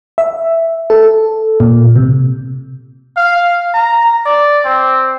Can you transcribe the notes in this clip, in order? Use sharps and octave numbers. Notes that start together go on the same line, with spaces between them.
E5
A4
A#2
C3
F5
A#5
D5
C4